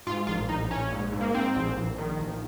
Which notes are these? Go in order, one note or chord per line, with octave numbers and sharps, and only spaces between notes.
G#2 F4
A#1 F4
A#1 D#4
A#1 C#4
G#2
G#2
A#3
G#2 C4
A#1
A#1
D#3
A#1